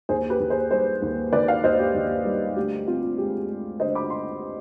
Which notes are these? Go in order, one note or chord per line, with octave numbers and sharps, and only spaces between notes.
D#2 G#4 C5
G4 B4
D#2
G#4 C5
G3 G#4 C5
D#2
D#3 B4 D5
D5 F5
D#2 C5 D#5
G4
D#2
G3
D2 G4
C4 F4
G#3 G4
G#3
D3 C5 D#5
B5 D6
C6